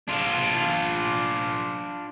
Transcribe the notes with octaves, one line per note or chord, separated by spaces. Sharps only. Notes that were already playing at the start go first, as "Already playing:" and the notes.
D4 F4